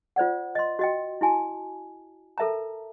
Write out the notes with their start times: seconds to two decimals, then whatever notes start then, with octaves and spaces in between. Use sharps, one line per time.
0.16 F4 C5 D5 F#5
0.55 D#5 C6
0.79 F#4 D#5 G5
1.21 E4 F#4 G#5 A5
2.38 A4 A#4 E5 A5 A#5